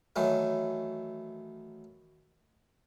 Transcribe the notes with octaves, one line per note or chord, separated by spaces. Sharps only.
D#3 E3 F#3 A3